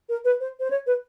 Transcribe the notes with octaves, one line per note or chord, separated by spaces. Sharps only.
A#4
B4
C5
C5
C#5
B4